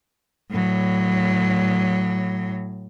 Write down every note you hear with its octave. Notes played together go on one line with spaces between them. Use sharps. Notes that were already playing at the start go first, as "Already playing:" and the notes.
A2 F#3